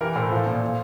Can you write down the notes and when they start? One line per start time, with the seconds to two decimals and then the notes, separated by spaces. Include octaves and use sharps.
0.01 E3 G4 A#4
0.16 A2 A4 C5
0.31 F3
0.46 A#2
0.62 F3